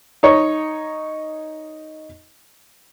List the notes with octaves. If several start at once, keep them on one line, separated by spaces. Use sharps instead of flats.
D#4 C#5 D#5